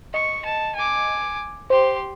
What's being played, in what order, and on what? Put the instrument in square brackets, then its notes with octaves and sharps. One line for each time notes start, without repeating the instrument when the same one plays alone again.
[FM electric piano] D#5 [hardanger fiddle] C#6
[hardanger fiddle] A5
G#5 D6
[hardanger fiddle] G4 C6 [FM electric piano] C5